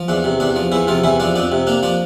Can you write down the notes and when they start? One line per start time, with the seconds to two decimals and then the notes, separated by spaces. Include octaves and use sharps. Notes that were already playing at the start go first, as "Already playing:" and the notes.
Already playing: F3
0.08 E2 D4
0.24 C3
0.40 E2 D4
0.56 F3
0.72 E2 E3 E4
0.88 C3 F3 F4
1.04 E2 E3 E4
1.20 F3 D4
1.36 F2 D4
1.52 C3
1.67 A#3 D4
1.83 F3 D4